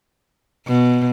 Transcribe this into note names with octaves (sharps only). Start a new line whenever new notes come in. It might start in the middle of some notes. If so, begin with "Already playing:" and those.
B2